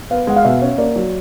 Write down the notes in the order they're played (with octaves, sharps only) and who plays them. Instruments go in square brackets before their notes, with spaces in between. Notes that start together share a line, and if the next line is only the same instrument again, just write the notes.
[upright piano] B3 [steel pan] F5
[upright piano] G#3 [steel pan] F#5
[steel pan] F5
[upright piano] B2 [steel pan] E5
[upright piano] C#4
[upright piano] A#3 [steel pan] D5
[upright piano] F#3